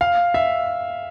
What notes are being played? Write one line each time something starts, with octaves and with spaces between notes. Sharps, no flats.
F5
E5